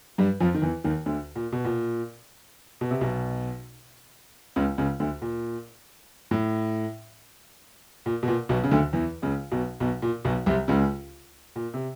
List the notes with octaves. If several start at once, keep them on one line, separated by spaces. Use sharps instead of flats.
G2 G3
F2 F3
D#3
E2 E3
D#2 D#3
D2 D3
A#2
B2
A#2
B2
C3
B1 B2
C#2 C#3
C#2 C#3
D2 D3
A#2
A2
A#2
B2
A#2
B1 B2
C#3
D2 D3
E2 E3
C#2 C#3
B1 B2
B1 B2
A#2
B1 B2
C2 C3
C#2 C#3
A#2
C3